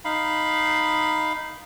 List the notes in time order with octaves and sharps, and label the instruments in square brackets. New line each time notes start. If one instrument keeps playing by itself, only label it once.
[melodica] D#4 F5 B5